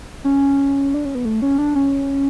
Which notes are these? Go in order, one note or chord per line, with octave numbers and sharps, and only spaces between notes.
C#4
D4
C#4
B3
A3
C#4
D4
C#4